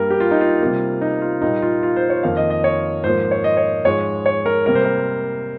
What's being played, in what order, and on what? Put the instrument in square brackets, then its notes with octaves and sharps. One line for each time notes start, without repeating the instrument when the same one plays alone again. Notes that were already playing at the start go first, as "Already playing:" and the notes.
Already playing: [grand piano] G2 G3 A#3 A#4
G4
F4
D#4
F4
C3 G3 A#3
D#4
F4
A#2 G3 A#3 D#4
F4
F4
C5
C#5
F2 D#3 A#3 F5
D#5
D#5
C#5
G#2 F3 A#3 C5
C#5
D#5
C#5
G#2 F3 G#3 C#5
C#5
A#4
C3 G3 A#3 A#4
C5
A#4